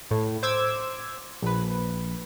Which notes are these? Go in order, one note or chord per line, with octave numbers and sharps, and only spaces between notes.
A2
C5 D6 E6 G#6
A#1 B4